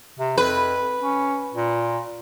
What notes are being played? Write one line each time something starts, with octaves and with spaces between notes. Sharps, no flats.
C3
F2 B4
C#4
A#2